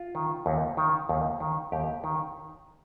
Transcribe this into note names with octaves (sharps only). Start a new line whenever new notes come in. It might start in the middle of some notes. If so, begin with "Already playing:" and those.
Already playing: F4
D#3
D#2
D#3
D#2
D#3
D#2 G4
D#3